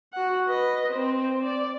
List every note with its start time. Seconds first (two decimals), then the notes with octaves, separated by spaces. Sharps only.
0.13 F#4 F#5
0.47 B4 D#5
0.92 C4 C5
1.43 D5